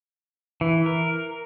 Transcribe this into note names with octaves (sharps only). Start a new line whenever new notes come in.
E3
A#4